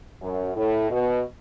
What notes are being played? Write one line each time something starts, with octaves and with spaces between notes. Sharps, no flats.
F#2
A2
B2